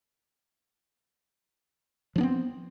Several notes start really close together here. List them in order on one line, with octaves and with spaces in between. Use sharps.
F3 D4 B3 C4